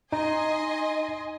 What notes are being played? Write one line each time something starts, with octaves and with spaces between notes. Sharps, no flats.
D#4 D#5 G#5 C6